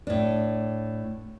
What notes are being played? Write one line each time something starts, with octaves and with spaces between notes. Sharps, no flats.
A2 D4